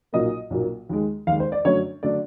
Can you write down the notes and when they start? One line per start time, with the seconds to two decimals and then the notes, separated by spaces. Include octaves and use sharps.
0.13 B1 A#2 F#3 A#3 D#5
0.50 B1 A#2 F#3 A#3
0.89 D#2 D#3 G#3
1.27 D#2 D#3 G#3 F5
1.40 C5
1.52 D5
1.65 F#2 D3 F#3 A3 D4 C#5
2.03 D3 F#3 A3 D4 D5